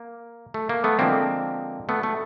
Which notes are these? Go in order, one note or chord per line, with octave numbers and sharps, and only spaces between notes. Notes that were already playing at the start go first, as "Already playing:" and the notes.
Already playing: A#3
A3
A#3
A3 B3
D3 F3 G#3 A#3 C4
A3 B3
A3